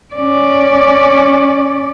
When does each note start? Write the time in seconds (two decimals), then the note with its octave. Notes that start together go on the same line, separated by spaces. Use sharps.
0.14 C#4 D5